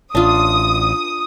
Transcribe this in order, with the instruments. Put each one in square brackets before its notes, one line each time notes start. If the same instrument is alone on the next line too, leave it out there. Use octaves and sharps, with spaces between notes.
[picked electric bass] A1 [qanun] D4 F4 [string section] D#6